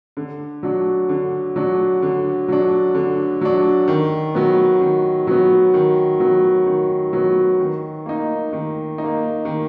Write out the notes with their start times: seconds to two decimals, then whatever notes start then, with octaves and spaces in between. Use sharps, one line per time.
0.17 D3
0.63 F#3 D4
1.09 D3
1.56 F#3 D4
2.02 D3
2.48 F#3 D4
2.95 D3
3.41 F#3 D4
3.88 D#3
4.35 F#3 B3
4.81 D#3
5.27 F#3 B3
5.74 D#3
6.20 F#3 B3
6.66 D#3
7.13 F#3 B3
7.59 D#3
8.06 A#3 D#4
8.53 D#3
8.98 D#4
9.03 A#3
9.45 D#3